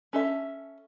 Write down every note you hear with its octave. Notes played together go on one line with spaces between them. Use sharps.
C#4 A4 E5